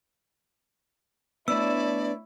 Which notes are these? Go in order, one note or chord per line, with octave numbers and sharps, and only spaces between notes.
A3 B3 D4 E4 C#5 D5 A5 E6